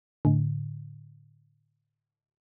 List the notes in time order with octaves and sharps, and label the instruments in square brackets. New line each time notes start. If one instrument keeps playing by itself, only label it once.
[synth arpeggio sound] A2 D3